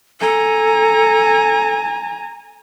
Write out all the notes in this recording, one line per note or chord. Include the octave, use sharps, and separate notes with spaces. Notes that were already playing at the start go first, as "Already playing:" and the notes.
A4 G#5 A#5